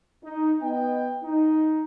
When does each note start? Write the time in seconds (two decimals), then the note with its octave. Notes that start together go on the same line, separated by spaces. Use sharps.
0.24 D#4
0.61 B3 D#5 G5
1.23 D#4